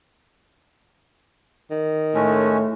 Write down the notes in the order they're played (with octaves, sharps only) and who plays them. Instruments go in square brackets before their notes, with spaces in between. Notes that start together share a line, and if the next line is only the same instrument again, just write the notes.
[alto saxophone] D#3
[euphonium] A2 [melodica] G#3 A3 C#4